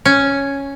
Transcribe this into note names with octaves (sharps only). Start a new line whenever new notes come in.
C#4